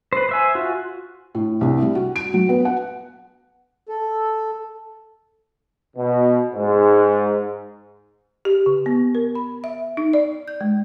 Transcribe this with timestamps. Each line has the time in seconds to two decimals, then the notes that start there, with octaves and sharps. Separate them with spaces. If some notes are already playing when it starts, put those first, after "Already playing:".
0.13 B4 C5
0.29 C5 E5 G#5
0.55 F4 F#4
1.35 A2
1.61 C2
1.82 G3
1.95 F#4
2.16 D7
2.34 F#3
2.49 B3
2.65 F#5
3.89 A4
5.97 B2
6.54 G#2
8.45 G4
8.66 C#3
8.86 B3
9.15 A#4
9.35 B5
9.64 E5
9.97 D#4
10.13 D5
10.48 G6
10.61 G#3